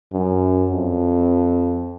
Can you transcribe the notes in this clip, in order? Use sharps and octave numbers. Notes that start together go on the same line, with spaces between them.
F#2
F2